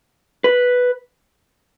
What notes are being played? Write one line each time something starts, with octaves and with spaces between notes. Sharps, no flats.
B4